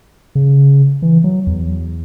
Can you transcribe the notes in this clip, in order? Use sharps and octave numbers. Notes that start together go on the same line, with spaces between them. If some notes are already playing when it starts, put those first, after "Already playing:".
C#3
E3
F#3
E2